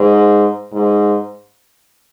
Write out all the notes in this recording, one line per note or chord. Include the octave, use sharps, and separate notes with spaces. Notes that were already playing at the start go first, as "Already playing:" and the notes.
Already playing: G#2
G#2